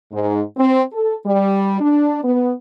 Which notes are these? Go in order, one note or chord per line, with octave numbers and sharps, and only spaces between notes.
G#2
C4
A4
G3
D4
B3